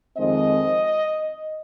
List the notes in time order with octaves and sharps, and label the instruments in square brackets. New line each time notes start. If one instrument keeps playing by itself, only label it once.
[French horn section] F2 D#3 G#3 C4 D#5